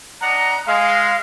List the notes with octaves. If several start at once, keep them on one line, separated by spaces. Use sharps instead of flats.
D4 D#5 F#5 A#5
G#3 F5